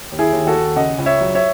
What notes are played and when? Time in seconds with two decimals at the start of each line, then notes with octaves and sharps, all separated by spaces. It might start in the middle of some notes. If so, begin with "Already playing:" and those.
0.12 D#2
0.19 E4 G#4
0.33 D#2
0.47 F#4 A4
0.55 D#2
0.76 C#3 D#5 F#5
0.98 C#2
1.06 C#5 E5
1.21 F#3
1.35 C#5 E5